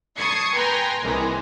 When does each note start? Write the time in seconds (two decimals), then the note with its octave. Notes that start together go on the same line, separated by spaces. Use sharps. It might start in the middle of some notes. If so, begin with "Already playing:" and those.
0.17 A5 C#6 D#6 G#6 C7 C#7
0.54 B4 G5 G#5 A#5 C6
1.03 C2 C3 D#3 E3 G#3 A#3